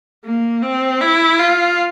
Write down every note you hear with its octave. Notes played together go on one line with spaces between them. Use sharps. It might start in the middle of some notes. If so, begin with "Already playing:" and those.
A#3
C4
E4
F4